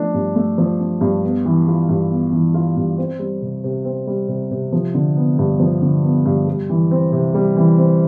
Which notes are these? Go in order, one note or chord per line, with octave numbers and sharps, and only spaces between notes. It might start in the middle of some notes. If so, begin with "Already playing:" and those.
Already playing: F3 A3 D4
G2
A3
F3
D4
G2
B3
E3
F4
G2
B3
E3
F4
G2
C4
G3
C3
C3
C4
G3
C3
C3
F3
D3
B3
G2
F3
D3
B3
G2
G3
E3
C4
C3
G3
E3
C4